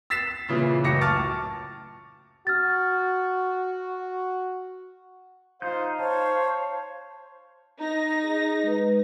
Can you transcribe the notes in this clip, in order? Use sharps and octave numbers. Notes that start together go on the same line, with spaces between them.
E6 A6 B6 C7 E7
A#2 C#3 E3
C#2 F#2 A2 D6 A#6 C#7
A5 C#6 D6 F6 A6
F#4 F6 A6
D#4 F4 C5 F5 G6
C5 C#5 A5
D#4 A#6
G#4
G#3 B4